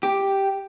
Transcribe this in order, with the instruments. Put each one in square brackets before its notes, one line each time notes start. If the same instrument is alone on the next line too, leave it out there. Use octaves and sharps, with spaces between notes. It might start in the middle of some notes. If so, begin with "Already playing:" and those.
[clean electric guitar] G4